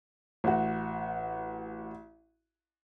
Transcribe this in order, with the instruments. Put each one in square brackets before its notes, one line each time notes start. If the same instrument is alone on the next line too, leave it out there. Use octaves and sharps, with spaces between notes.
[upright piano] A1 F#4